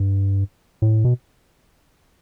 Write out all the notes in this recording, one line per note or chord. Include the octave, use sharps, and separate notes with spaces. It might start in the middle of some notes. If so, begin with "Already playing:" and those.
Already playing: G2
A2
B2